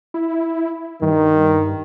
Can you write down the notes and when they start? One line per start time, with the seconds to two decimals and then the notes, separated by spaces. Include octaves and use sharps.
0.14 E4
1.02 G2 D#3